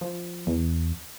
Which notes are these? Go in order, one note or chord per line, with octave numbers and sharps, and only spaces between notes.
F3
E2